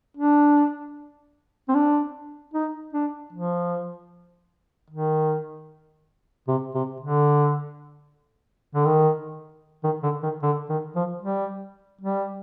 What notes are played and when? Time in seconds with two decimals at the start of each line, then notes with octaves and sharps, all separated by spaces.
0.17 D4
1.69 C4
1.75 D4
2.54 D#4
2.93 D4
3.33 F3
4.90 D#3
6.48 C3
6.74 C3
7.01 D3
8.75 D3
8.85 D#3
9.84 D#3
10.03 D3
10.23 D#3
10.43 D3
10.69 D#3
10.95 F3
11.22 G3
12.01 G3